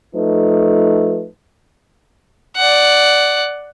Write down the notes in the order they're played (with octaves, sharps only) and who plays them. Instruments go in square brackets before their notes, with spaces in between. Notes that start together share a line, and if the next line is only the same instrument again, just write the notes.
[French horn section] F3 A3 D#4 B4
[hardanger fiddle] D5 F#5